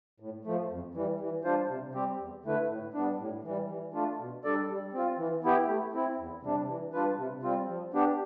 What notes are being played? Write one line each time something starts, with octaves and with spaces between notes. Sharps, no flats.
A2
F3 A3
F2
E3 G3
E3
G3 D4 F4 C5
C3
G3 C4 G4
E2
D3 A3 E4 B4
A2
G3 B3 D4
A2
E3 G3
E3
A3 D4 F4
B2
G3 D4 A4 D5
G3
C4 F4
E3
B3 E4 G4
A3
C4 E4
E2
C3 G3 D4
E3
G3 D4 F4 B4
C3
G3 C4 F4
F3
B3 D4 G4